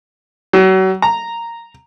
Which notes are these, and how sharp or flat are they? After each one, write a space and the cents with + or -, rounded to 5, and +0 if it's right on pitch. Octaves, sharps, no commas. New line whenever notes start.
F#3 +35
A#5 -5